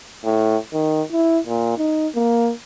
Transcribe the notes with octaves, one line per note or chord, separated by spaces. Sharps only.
A2
D#3
E4
A#2
D#4
A#3